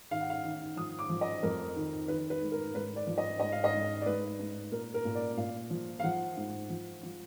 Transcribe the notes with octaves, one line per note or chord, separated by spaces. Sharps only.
D#3 F5
F#5
F5
D#3
F3 D#6
D6
F3
D#5
F2 A#4
D#3
D#3 B4
B4
G#2
A#4
G#2 B4
D5
F3
D#5
G#2 D#5
F5
D#5
G#2
D5
G#2 B4
G#2
A#2 A#4
A#4
A#2
D5
A#2 F5
F3
F5
F3 F#5
G#2
F3
F3